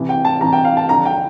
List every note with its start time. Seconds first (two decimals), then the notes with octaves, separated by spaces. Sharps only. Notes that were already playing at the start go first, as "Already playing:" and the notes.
Already playing: C2 C3 E3
0.09 G5
0.25 A5
0.41 C2 C3 E3 A#5
0.53 G5
0.65 F5
0.77 A5
0.89 F2 D3 F3 A#5
1.05 G5